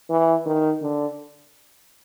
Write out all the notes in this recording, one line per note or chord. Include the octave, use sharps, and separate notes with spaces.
E3
D#3
D3